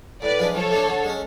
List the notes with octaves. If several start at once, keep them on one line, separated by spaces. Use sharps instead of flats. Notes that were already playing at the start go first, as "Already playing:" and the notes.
A2 B4 D5
F3 G#3 D4
F3 A4 C#5
A3 D4
D3
G#3 C#4